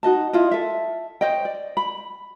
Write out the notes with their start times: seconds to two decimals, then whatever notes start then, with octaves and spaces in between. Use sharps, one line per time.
0.03 D#4 F#4 D#5 A5
0.33 E4 F4 D#5
0.51 A4 E5
1.21 C5 C#5 D#5 G5
1.45 D5
1.77 B5